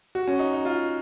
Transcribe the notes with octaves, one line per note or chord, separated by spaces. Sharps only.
F#4
C#4
D#4
D#4
F4